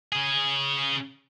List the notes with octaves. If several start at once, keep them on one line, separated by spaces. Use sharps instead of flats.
C#3 G#4